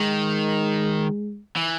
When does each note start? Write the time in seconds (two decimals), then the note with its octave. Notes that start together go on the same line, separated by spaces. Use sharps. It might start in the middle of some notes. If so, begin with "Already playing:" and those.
Already playing: D#3 G#3
1.57 E3